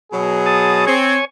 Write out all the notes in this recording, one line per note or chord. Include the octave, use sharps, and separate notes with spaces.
B2 F#3 G#4
A5 D#6
C4 C#5 G#5